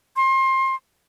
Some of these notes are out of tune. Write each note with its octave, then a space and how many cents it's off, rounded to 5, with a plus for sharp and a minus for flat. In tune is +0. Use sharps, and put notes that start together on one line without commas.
C6 +30